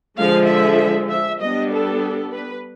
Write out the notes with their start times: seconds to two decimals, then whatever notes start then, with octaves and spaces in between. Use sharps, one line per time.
0.18 D3 F3 G#3 F5
0.48 E5
1.10 E5
1.40 G3 B3 D4 D#5
1.70 A4
2.31 B4